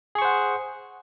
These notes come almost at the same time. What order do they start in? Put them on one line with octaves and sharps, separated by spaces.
G#4 C#6 C5 F#5